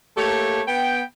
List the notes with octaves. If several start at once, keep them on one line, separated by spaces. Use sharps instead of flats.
A3 A#3 G4 A4 C#5
B3 G5